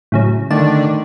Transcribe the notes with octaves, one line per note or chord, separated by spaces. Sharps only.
A2 C#3 F#3
D3 D#3 A3 A5